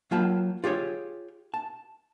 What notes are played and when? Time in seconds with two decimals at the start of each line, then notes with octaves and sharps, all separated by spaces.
0.11 F#3 A#3 F4 G5 A5 B5
0.64 F4 G4 G#4 C#5
1.54 A5